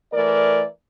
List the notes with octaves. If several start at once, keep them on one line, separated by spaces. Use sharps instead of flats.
E3 A3 A#4 D5